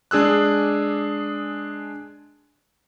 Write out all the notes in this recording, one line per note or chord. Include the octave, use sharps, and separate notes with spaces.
G#3 D4 G#4 E6 F#6